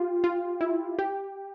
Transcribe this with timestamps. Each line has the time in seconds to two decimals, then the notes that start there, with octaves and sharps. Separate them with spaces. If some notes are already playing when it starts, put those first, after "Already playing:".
Already playing: F4 G4
0.24 F4
0.61 E4
0.99 G4